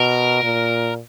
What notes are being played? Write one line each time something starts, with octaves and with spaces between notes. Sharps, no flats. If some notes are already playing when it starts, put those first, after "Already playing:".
Already playing: B2 A#4
A#2